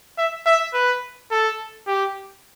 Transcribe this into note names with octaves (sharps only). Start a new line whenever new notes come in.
E5
E5
B4
A4
G4